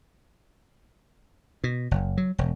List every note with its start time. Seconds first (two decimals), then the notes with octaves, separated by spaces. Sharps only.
1.64 B2
1.91 F#1
2.17 F#3
2.38 E1